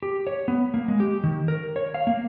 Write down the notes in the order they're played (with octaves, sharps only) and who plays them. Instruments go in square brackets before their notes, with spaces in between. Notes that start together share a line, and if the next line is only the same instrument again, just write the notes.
[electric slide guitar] G4
C#5
B3
A#3
G#3
G4
D#3
A#4
C#5
F5
A#3